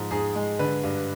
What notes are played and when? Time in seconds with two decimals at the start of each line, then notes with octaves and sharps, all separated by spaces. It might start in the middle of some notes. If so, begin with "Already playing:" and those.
Already playing: G#2 F3
0.11 G#2 G#4
0.36 G#3
0.59 D3 B4
0.83 G2